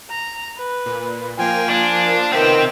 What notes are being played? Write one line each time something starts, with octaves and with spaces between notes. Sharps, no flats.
A#5
B4
A#2
F3 A#3 F4 G5 G#5
D4 G#5
D#3 B3 C4 C5 E5 G5